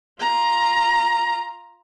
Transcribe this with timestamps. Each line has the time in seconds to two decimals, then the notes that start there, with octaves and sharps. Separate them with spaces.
0.20 F4 A#5